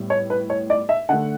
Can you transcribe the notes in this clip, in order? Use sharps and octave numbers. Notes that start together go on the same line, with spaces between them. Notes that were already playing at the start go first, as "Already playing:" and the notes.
Already playing: A2 G3 B3
C#5
B4
C#5
D5
E5
D3 A3 F#5